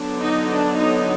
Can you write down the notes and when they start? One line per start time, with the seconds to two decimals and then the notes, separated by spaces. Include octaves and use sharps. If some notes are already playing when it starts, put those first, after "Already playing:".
Already playing: D3 F#3 B3 D4
0.19 D#4
0.47 D4
0.76 D#4